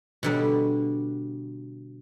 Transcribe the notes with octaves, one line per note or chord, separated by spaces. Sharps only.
B2 D3 G3